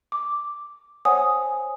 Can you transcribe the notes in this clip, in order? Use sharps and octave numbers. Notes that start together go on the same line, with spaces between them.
D6
C5 C#5 F#5 G#5 D#6